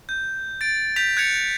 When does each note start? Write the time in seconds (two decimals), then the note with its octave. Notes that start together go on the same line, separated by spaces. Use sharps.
0.09 G6
0.61 A6 D7
0.96 G6 B6 F7
1.17 F#6 G#6 A6 C#7 F7